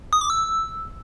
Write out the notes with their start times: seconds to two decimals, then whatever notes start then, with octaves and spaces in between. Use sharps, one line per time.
0.13 D#6
0.21 D6
0.30 E6